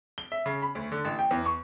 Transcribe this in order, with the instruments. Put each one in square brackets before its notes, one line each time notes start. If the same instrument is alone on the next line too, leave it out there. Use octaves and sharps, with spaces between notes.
[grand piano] G7
E5
C#3
B5
D2
D3
A1
G5
E2
C#6